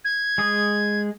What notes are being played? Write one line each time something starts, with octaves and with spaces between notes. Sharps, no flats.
G#6
G#3 G#4 D#6